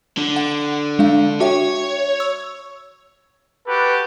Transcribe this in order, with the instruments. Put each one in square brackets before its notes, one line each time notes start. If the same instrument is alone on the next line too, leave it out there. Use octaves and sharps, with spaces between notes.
[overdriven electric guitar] D3
[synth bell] F#5
G#3 D4 F5
[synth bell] F#4 E5 G5 [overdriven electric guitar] C#5
[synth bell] C#6 E6
[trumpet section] F#4 G4 A4 [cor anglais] B4